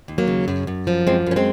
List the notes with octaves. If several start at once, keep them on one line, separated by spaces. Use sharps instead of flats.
D#2
F#3 A#3
C#3
F#2
F#2
F3
F#2 G#3 C4
F#2 C#4
G#3 C4